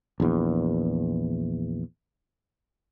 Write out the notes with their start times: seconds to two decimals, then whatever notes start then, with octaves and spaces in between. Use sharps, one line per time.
0.20 A#1 E2